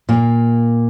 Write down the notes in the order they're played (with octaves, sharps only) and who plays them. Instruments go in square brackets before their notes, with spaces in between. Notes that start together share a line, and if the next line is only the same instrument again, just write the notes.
[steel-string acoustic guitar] A#2 A#3